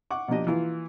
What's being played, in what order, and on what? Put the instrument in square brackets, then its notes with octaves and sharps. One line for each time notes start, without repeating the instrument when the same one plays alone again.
[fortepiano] F#5 C#6 D6
B2 F3 A#3 D4 G4 D#5
E3 A#3 E4 F4